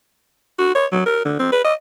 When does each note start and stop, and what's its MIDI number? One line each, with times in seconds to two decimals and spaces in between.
0.58 0.72 66
0.75 0.86 73
0.92 1.04 54
1.06 1.20 70
1.25 1.35 50
1.39 1.48 60
1.52 1.61 71
1.64 1.74 75